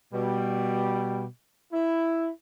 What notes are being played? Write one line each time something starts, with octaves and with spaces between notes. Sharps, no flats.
B2 G3
E4